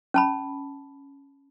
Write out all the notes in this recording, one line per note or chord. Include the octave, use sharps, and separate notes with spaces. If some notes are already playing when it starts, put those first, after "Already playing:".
C#4 A5 B5